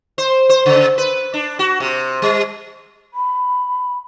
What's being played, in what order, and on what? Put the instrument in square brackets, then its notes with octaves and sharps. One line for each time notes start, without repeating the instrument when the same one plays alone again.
[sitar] C5
C5
C#3
B4
D4
F#4
C3
G3
[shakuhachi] B5